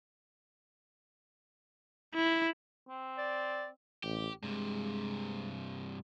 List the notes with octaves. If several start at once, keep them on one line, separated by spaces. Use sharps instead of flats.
E4
C4
D5
A1 G4
G2 C3 G#3